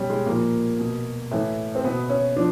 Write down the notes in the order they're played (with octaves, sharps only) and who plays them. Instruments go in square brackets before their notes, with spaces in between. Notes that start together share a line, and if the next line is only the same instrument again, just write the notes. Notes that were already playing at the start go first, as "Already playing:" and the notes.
Already playing: [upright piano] B2 G3 C#4
G#3
A#2 F3 A#3
B2
A2 E3
C4
B2 B3
C#4
F3 D4